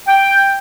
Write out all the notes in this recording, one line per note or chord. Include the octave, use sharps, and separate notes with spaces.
G5